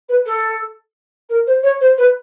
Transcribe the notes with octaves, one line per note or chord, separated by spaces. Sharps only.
B4
A4
A#4
C5
C#5
C5
B4